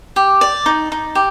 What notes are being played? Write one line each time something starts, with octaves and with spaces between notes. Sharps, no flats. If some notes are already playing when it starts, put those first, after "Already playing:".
G4
D5
D#4
D#4
G4